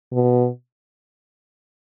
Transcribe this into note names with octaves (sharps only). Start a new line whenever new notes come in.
B2